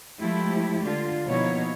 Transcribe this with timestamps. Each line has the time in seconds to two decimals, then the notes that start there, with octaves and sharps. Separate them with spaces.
0.20 F3 G#3 A3 E4 G4
0.83 D3 F4
1.28 B2 F3 A#3 D#4 E4 C#5